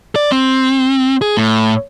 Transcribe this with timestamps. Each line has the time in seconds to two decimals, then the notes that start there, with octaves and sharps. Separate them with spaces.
0.16 D5
0.32 C4
1.21 G#4
1.37 A2